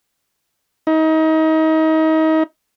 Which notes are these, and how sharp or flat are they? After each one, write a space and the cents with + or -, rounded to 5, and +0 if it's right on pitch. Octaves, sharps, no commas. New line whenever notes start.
D#4 +30